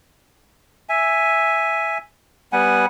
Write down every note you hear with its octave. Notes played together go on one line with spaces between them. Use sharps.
E5 G#5
G3 B3 F#5 G#5